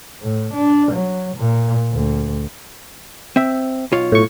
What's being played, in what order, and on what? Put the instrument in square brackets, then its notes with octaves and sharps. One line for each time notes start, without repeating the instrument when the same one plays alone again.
[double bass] A2
D4
F#3
A#2
D2
[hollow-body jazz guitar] C4 E5
B1 F4 C#5
[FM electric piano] A2 C#6